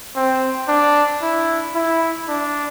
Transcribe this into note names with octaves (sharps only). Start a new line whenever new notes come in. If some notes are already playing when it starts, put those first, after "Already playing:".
C4
D4
E4
E4
D4